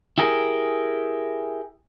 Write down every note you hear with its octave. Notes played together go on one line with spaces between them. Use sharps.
E4 G4 G#4 A#4